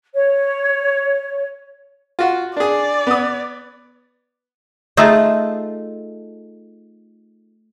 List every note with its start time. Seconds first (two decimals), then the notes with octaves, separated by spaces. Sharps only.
0.13 C#5
2.19 F4 F#4
2.57 D4 G#4 D5
3.07 B3 D#6
4.97 A3 D#4 F4 G#4 A4